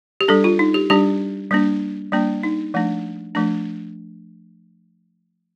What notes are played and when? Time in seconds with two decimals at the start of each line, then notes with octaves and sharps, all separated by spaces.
0.21 G4
0.28 G3 D4 A4
0.44 F4
0.59 D#4
0.74 G4
0.90 G3 D4 G4
1.51 G3 A#3 D4
2.12 G3 A#3 D4
2.43 D#4
2.74 F3 A3 D4
3.35 F3 A3 D4